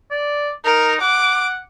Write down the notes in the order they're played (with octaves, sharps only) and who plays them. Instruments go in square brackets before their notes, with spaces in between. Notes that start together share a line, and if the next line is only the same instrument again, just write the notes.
[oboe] D5
[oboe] D#4 [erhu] A#4
[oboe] F#5 [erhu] D6